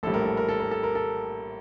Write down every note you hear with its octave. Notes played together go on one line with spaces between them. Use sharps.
A#1 A2 G3 A4
A#4
A4
A#4
A4
A#4
A4
A#4
A4